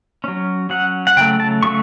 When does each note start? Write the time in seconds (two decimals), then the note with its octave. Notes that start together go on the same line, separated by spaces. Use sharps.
0.24 F#3 C#4
0.70 F#3 C#4 F#5
1.07 F#5
1.17 C#3 F#3 A3 G5
1.40 A5
1.63 C#3 F#3 A3 C#6